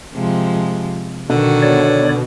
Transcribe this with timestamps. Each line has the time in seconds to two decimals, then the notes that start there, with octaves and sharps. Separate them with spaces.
0.14 C3 F3 G#3
1.30 B2 D3 D#3 F#4
1.62 C#5 D5